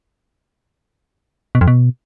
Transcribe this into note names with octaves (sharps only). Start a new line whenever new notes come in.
B2
F2
B2